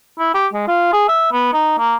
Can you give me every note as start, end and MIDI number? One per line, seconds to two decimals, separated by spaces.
0.19 0.30 64
0.34 0.47 67
0.53 0.67 56
0.68 0.92 65
0.93 1.05 68
1.09 1.31 76
1.32 1.48 59
1.53 1.75 63
1.79 1.95 58